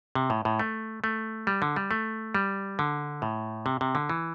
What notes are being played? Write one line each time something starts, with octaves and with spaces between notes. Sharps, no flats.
C3
A2
A2
A3
A3
G3
D3
G3
A3
G3
D3
A2
C3
C3
D3
E3